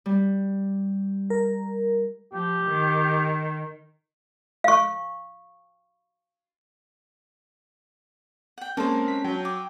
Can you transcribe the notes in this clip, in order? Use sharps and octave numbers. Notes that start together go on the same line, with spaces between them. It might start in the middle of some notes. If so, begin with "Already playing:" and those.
G3
A#4
F3 G4
D#3
F5 C#6
F#5 G5
G#3 A#3 C4 C#4 A4 A#4 C5
B6
F#3 G5
D6